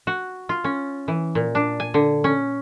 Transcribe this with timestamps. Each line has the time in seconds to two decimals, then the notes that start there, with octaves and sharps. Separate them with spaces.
0.07 F#4
0.49 F4
0.64 C#4
1.08 E3
1.35 A#2
1.55 D4
1.80 G#5
1.94 D3
2.24 C#4